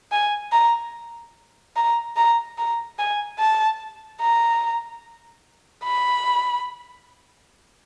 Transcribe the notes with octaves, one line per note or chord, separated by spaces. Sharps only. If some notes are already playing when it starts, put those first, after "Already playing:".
G#5
A#5
A#5
A#5
A#5
G#5
A5
A#5
B5